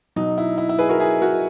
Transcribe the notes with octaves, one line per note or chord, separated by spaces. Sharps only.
B2 F#3 D#4
E4
E4
E4
G#4 B4
F#4 A#4
E4 G#4
F#4 A#4